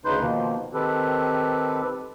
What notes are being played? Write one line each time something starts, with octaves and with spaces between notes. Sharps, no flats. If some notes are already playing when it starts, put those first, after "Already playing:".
D2 C#3 D#4 B4 C6 G6
B2 D#3 F3 A#3
D#3 C4 G4 A4 B4